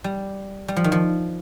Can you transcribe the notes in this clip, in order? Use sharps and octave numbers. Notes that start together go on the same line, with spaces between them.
G3
G3
F3
D#3
F3